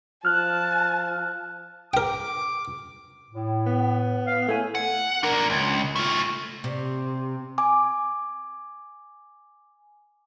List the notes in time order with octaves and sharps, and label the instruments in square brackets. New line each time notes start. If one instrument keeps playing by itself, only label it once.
[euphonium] F3 [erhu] A5 [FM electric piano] F6 F#6
[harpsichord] A#4 G5 [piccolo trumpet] D6
[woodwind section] A2
[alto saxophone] B3
[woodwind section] F5
[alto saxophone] A3 [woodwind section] E4 C#5 G#5
[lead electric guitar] F#5
D4 A#4
C#2
A3 F4
[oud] C3
[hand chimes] G#5 D6